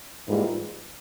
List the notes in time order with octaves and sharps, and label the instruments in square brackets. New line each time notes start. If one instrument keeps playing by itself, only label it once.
[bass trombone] G#2 [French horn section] E3 G3 A#3 F4 A#4